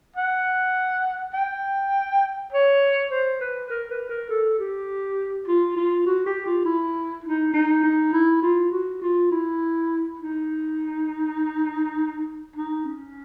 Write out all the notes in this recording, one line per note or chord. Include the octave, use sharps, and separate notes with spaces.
F#5
G5
C#5
C5
B4
A#4
B4
A#4
A4
G4
F4
F4
F#4
G4
F4
E4
D#4
D#4
D#4
E4
F4
F#4
F4
E4
D#4
D#4
C#4